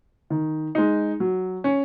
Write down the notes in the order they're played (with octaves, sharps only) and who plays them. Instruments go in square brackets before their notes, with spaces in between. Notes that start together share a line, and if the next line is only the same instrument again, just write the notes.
[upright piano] D#3
G#3 D#4
F#3
C#4